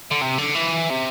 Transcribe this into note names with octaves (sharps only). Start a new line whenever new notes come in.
D3
C3
D3
E3
C3